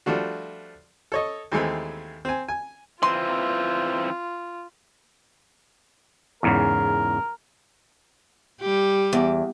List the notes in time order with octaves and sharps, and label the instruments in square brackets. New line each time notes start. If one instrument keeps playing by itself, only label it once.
[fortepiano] F3 G3 A3 D4 F#4
A4 C#5 D#5
D#2 E3 G#3 A3 C4
C4 G#5
G#5
[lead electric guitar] E3 C4 [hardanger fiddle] F4 [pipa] C6
[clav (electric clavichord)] E2 G#2 C#3 [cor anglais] A#4
[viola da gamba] G3 G4
[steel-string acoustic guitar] E2